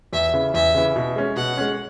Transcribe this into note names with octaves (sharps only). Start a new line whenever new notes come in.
E2 E5
C#3 E3
E2 E5
C#3 E3
B2
G#3 C#4
B2 F#5
G#3 C#4